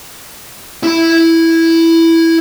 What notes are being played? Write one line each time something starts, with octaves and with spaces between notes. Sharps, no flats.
E4 B5